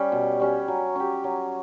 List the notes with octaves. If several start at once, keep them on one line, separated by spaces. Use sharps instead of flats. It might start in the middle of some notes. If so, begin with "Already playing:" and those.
Already playing: G3 C#4
B2
G3 C#4
F#3
C#4 G4
F#3